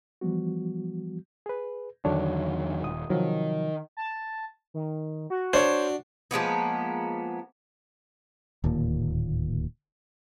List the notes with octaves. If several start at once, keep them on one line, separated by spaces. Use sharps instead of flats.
E3 F3 G3 B3 F#4
G#4 B4
E2 D3 D#3 F#3 D4 C#5
D#1 D#6
C3 D#3 F3 F#3
A5
D#3
F#4
D4 C5 C#5
F3 G#3 A#3 B3
D1 D#2 A#2